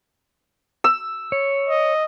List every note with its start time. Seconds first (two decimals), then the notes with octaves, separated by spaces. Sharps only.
0.84 E6
1.32 C#5
1.69 D#5